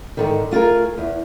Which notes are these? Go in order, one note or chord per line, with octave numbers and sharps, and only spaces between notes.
G#2 D3 D#3
A3 F4 G4 G#4 A#4
E2